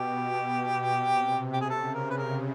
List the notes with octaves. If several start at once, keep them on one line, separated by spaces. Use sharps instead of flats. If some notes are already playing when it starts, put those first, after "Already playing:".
Already playing: B2 G4
C3
G4
G#4
C#3 A4
A#4
B4
A#4